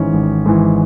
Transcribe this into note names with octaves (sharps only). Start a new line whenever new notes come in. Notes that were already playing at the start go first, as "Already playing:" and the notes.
Already playing: G#1 G#2 E3 C#4
G#1
G#2 E3